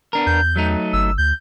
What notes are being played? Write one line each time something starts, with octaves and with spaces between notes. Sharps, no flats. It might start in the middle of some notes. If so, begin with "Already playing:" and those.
B3 D4 A#4
E2 G6
F#3 A3 D#4
G1 E6
D2 G6